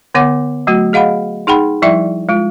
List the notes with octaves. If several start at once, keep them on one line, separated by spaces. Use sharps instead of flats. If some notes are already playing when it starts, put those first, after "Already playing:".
D3 B3 C#5 F#5 D6
F#3 A3 F#4
G#4 D#5 F5 F#5 B5
D#4 G#4 F#5 G5 B5
F3 G3 E4 D5 E5 G5
G#3 F4